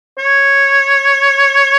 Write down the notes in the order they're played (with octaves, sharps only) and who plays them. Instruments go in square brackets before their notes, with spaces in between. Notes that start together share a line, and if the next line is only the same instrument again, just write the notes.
[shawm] C#5